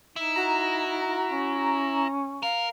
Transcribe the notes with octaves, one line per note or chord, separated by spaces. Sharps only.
D#4 E4
F#4 A#5
C#4
A#4 F5